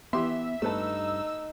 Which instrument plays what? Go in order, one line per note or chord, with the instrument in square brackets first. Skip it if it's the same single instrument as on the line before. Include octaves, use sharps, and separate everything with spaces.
[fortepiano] E3 G4 C6 [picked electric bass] B3 [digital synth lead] E5
[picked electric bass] G2 [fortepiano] A3 B4 A5 [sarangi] D#4 [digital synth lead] E6